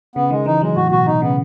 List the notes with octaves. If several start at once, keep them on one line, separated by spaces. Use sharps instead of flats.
C#3 B3
D#3 G#3
E3 D#4
F#3 G#3
A2 F#4
B2 F#4
B2 D#4
C#3 B3